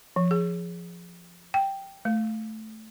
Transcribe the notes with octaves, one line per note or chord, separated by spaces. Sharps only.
F3
G#4
G5
A3